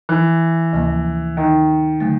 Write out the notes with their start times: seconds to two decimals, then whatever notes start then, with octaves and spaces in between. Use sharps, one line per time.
0.09 E3
0.73 D2 C3 F3 A#3
1.37 D#3
2.01 D3 F#3 A3